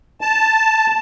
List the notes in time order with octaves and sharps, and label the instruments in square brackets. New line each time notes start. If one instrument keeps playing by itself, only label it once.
[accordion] A5